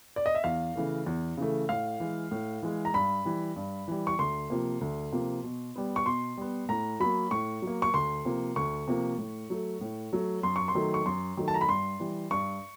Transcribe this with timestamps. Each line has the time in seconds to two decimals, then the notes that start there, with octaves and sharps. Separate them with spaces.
0.16 D5
0.26 D#5
0.35 E5
0.44 E2 F5
0.75 C#3 E3 A3
1.06 E2
1.38 C#3 E3 A3
1.69 A2 F5
2.00 E3 G#3
2.31 A2
2.63 E3 G#3
2.85 A#5
2.94 G2 B5
3.25 E3 G3
3.56 G2
3.88 E3 G3
4.07 C#6
4.19 D2 C6
4.50 C3 F3 A#3
4.81 D2
5.12 C3 F3 A#3
5.43 B2
5.76 G3 B3
5.96 C#6
6.06 B2 C6
6.37 G3 B3
6.69 A2 A#5
7.00 F#3 A#3 B5
7.31 A2 C#6
7.62 F#3
7.67 A#3
7.82 C#6
7.94 D2 C6
8.25 C3 F3 A#3
8.56 D2 C#6
8.88 C3 F3 A#3
9.18 A2
9.50 F#3 A3
9.81 A2
10.13 F#3 A3
10.43 F#2 C6
10.56 C#6
10.68 C6
10.75 D#3 F#3 A3
10.94 C#6
11.06 F#2 C6
11.37 D#3 F#3 A3
11.48 A5
11.54 A#5
11.61 B5
11.68 G2 C6
12.00 E3 G3
12.31 G2 C#6